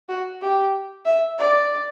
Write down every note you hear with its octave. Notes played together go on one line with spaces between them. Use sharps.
F#4
G4
E5
D5